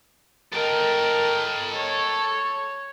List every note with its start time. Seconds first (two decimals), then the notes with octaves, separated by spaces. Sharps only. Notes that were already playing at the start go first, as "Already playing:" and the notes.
0.53 A4 A#4 D#5 G5
1.75 C#5